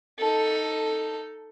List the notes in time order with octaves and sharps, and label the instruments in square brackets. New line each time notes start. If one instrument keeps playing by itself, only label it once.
[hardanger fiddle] D#4 A4